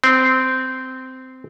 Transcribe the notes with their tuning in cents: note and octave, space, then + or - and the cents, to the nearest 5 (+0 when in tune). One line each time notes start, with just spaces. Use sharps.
C4 -15